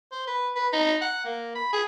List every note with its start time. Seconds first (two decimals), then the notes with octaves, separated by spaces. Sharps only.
0.12 C5
0.27 B4
0.56 B4
0.73 D#4
1.01 F#5
1.25 A#3
1.55 B5
1.73 G#4